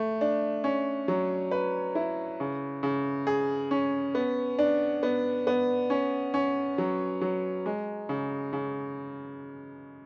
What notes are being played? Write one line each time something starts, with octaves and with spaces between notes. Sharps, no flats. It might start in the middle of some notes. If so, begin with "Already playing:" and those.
Already playing: A3
D4
C#4
F#3
B4
E4
C#3
C#3
G#4
C#4
B3
D4
B3
B3
C#4
C#4
F#3
F#3
G#3
C#3
C#3